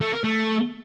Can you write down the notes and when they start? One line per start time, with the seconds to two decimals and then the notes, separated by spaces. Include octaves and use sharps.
0.01 A3
0.12 A#4
0.24 A3